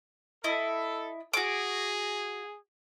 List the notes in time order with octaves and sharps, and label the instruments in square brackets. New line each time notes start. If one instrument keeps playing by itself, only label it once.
[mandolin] E4 D#5 [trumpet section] A4
[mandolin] F#4 D6 [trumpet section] G#4